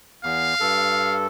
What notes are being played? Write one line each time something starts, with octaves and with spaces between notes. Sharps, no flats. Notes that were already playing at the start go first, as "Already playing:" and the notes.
E2 F5
G2 A4